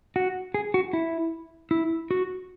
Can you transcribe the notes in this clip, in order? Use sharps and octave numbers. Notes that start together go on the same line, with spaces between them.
F#4
G#4
F#4
E4
E4
F#4